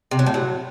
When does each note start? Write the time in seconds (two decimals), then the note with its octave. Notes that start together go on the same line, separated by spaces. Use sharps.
0.11 C3
0.19 F#3
0.26 A2
0.34 F#3